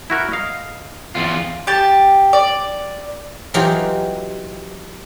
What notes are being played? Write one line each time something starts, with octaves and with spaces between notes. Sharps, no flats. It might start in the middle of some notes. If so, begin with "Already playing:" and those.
E4 F#4 A#4
D#5 F5
E2 F4
G4 A5
D5
E3 F#3 D#4 F4 G4